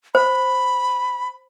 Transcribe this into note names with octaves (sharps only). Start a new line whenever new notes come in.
C5 B5